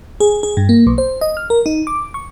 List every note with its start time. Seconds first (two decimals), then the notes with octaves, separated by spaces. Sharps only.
0.20 G#4
0.43 G#4
0.57 G2
0.69 A#3
0.87 B1
0.98 C5
1.21 D#5
1.37 F6
1.50 A#4
1.66 D#4
1.87 D6
2.14 C#6